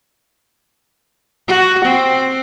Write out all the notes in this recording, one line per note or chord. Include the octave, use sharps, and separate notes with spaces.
F#4
C4